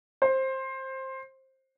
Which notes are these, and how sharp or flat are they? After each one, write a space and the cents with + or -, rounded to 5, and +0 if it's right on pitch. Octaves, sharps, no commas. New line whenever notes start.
C5 +15